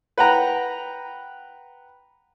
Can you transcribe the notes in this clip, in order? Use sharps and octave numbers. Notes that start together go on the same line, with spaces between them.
B4 F#5 G5 A#5 B5